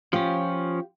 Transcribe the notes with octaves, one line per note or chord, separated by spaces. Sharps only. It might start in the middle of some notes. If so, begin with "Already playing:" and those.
F3 C#4 F4 G4